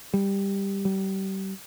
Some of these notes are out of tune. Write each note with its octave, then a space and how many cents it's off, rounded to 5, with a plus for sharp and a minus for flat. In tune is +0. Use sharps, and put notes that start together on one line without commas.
G3 +10
G3 -30